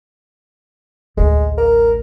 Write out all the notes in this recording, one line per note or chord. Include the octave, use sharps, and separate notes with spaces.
A1 D2 G#3
A#4